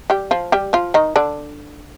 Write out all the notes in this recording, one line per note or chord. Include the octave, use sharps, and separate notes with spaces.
G3 G4
F3 F4
G3 G4
F3 F4
D#3 D#4
D3 D4